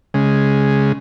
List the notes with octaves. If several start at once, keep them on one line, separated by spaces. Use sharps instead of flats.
C#3 G#3